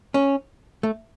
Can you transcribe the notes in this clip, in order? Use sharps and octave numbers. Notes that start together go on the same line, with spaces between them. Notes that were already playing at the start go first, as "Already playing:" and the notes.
C#4
A3